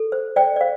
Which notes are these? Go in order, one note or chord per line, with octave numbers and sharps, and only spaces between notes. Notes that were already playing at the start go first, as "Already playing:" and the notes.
Already playing: A4
C5
C5 D5 G5
D5
C5 F5